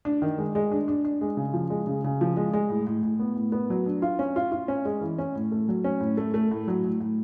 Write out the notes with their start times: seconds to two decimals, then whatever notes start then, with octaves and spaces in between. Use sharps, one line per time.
0.05 D4
0.22 D#3
0.38 G#3
0.55 G#3
0.71 D4
0.88 D4
1.05 D4
1.21 G#3
1.37 C#3
1.54 F3
1.70 G#3
1.87 C#3
2.04 C#3
2.21 F3
2.37 G#3
2.53 G#3
2.69 A2
2.87 A2
3.03 A2
3.20 B3
3.36 A2
3.52 B3
3.70 F#3
3.86 D4
4.02 F4
4.19 C#4
4.36 F4
4.52 F4
4.68 C#4
4.85 G#3
5.01 E3
5.18 C#4
5.35 A2
5.52 A3
5.68 F#3
5.84 C#4
6.01 A2
6.17 A3
6.34 A3
6.51 A2
6.68 F#3
6.84 A2
7.00 A2